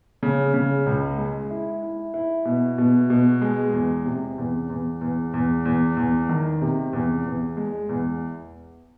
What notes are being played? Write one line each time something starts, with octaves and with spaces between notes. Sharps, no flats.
C#3
C#3
C#2
G#3
E4
E4
E4
B2
B2
B2
G#3
E2
C3
E2
E2
E2
E2
E2
E2
D#3
C3
E2
E2
G#3
E2